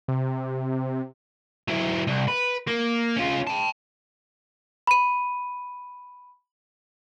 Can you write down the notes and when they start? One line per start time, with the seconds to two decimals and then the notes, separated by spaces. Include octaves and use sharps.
0.08 C3
1.68 F#3 E4
2.08 C2
2.28 B4
2.67 A#3
3.16 C#4 F4
3.47 G5 A5
4.87 B5 D#7